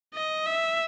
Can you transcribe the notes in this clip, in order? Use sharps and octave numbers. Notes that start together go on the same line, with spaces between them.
D#5
E5